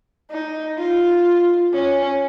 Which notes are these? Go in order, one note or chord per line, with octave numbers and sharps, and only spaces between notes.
D#4
F4
C#4